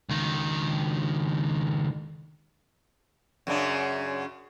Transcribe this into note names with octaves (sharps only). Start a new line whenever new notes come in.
C#2 D#3
F#2 C#3 D4